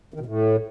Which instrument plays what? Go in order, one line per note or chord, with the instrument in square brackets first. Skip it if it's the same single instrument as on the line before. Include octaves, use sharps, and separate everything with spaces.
[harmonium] D#3
B2
A2